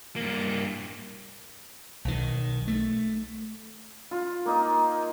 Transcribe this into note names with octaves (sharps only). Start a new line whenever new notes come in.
G2 A#3
B1 D#3
A3
F4
A#3 D#4